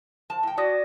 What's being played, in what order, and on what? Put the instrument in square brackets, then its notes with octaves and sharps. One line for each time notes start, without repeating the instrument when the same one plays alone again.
[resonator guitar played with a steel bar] F3 A5
A2 G5
[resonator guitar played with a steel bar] F#4 [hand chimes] D5 D#6 A#6